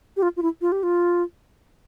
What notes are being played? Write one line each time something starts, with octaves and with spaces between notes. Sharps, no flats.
G4
F4
F4
E4
F4
G4
F4